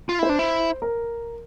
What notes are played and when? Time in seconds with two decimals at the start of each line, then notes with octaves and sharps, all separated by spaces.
0.09 F4
0.19 E4 C5
0.29 D4
0.39 E4
0.82 A#4